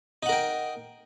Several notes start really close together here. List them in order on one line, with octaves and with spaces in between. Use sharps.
D#4 F#5 A#4 G5